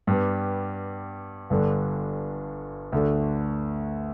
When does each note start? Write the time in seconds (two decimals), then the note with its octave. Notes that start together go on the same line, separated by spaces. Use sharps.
0.07 G2 G3 B3
1.50 G1 G2 D3
2.92 D2 D3 A3 D4